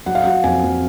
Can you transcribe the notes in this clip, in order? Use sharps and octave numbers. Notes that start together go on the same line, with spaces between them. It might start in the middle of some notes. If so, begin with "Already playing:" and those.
F#3 F#5
F5
F#3 F#5
F2 G#5
F2